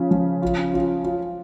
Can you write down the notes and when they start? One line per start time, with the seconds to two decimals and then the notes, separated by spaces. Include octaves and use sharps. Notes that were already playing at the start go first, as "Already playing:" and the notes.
Already playing: C#3 F3 F4
0.11 F3
0.42 F4
0.74 F4
1.04 F4